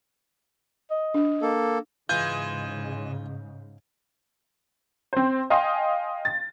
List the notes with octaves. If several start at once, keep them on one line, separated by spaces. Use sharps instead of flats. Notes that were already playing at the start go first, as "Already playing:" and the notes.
D#5
D4
A#3 A4
G#2 C#3 E3 G#3 F4 G#5 G6
C4 C5
D#5 F5 G5 G#5 C6
A6